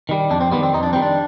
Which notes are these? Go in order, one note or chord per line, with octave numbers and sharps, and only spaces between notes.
D#3 G3
F2 D4
C4
D#3 G3 B3
C4
F2 D#4
D4
D#3 G3 C4
D4